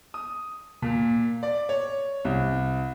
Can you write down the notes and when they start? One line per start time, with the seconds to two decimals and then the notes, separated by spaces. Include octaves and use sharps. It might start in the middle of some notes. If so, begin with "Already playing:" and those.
0.14 D#6
0.82 A#2
1.43 D5
1.69 C#5
2.25 C2